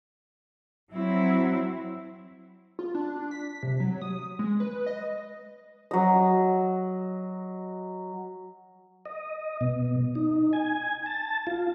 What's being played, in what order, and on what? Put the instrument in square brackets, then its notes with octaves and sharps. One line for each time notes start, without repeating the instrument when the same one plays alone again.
[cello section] F#3 C4 E4
[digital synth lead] F4
D4
D4
B6
C3
F#3
D#6
G#3
B4
D#5
[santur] F#3 D#5
[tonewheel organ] D#5
B2
D#4
G#5
A5
F4